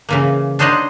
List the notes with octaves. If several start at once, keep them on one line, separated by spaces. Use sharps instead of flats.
C#3 E3 A#3
D4 D#4 C5 C#5 D#5 F#5